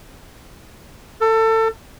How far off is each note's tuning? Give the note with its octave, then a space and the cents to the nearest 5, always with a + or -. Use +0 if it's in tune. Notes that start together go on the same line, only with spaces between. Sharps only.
A4 +25